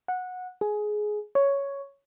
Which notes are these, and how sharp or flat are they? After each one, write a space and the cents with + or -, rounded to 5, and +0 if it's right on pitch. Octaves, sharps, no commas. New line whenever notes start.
F#5 -15
G#4 +15
C#5 +5